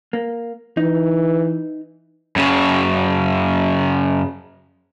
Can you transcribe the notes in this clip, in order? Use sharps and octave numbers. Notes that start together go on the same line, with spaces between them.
A#3
E3 D#4
F#2 C#3